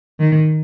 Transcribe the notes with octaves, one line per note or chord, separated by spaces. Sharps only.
D#3